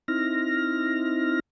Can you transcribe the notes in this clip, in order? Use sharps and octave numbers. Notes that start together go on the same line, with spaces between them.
C4 D#4 E4 F6 A#6